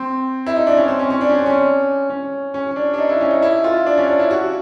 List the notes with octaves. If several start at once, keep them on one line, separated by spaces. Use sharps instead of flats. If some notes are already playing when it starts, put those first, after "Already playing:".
Already playing: C4
E4
D#4
D4
C#4
C4
C#4
C#4
D4
C#4
C4
C#4
C#4
C#4
C#4
D4
D4
D#4
E4
C#4
D#4
E4
F4
D4
C#4
D4
E4
F#4